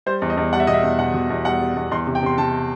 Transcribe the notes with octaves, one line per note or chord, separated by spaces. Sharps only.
G3 C5
E2
D#5
E2
G3 F#5
E5
B2 D#5
E5
E2
B2 F#5
B2
E2
G3 F#5
G3
E2
E2 C6
C3
G5
C3 C6
C3 A5